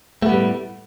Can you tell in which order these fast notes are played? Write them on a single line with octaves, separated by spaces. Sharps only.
A3 B3 G3 A2